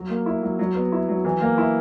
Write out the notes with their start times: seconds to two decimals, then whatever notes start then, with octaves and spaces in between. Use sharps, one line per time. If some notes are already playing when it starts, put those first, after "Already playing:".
Already playing: F#3
0.10 A#3
0.26 E4
0.43 F#3
0.59 F#3
0.75 B3
0.92 E4
1.08 F#3
1.25 E3
1.41 A#3
1.58 E4